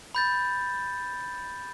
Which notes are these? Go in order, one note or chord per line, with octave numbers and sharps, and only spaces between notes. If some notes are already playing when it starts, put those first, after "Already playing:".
B5 G6 A6